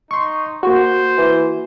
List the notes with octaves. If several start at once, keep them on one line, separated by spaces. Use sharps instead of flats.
D#4 C6 C#6
A#3 F#4 C5
E3